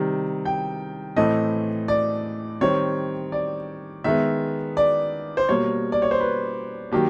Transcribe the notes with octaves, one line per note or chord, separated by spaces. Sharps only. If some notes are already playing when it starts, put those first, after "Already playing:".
Already playing: C3 D#3 G3
G5
A2 E3 A3 C4 D#5
D5
D#3 G3 C4 C#5
D5
D#3 G#3 B3 E5
D5
C5
B2 G3 A#3 C#5
D5
C#5
C5
B4
D#3 F#3 A#3 G4